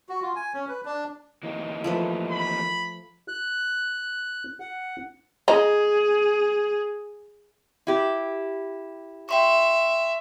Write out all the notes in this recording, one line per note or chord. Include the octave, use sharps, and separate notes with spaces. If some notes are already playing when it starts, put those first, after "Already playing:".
F#4
F4
G#5
C#4
B4
D4
E3 A#3 D#4
F3 A3 B4
B5
F#6
F#5
G#4 D#5 A#5
E4 G4
E5 G5 C6 C#6